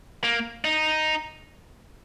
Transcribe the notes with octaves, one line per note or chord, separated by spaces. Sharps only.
A#3
D#4